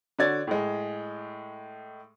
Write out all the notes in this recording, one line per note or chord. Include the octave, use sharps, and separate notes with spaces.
D3 F#4 C#5 D5 G#6 A6
A2 G#3